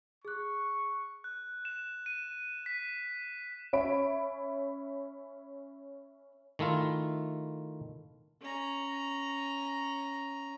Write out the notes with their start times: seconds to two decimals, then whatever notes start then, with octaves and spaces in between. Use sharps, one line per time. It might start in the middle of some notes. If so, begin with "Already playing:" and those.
0.25 G#4 C#6 F#6
1.24 F#6
1.65 E7
2.06 D#7
2.66 B6
3.73 C#4 C#5 E5 B5 D7
6.59 D#3 A3 E4 F4
8.42 C#4 A#5